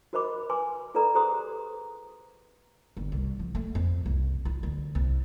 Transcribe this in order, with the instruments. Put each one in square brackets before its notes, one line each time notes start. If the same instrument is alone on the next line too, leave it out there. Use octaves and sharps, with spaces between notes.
[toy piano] F#4 A#4 C5 D#5 B5 D6
B4 G#5 C6 D6
F4 A4 B4 D5 A#5 B5
G4 G#4 C5 A#5 C6 D#6
[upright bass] G1
C2
F3
A3
F2
C2
F4
D2
C2